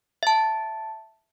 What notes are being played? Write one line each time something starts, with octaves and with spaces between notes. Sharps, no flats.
E5 A5